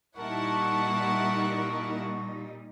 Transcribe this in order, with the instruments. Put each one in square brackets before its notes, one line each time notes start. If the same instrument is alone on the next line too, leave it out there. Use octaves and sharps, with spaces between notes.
[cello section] A#2 G3 D#4 [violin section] E4 F#5 A5 [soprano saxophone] A#4 [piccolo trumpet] C#6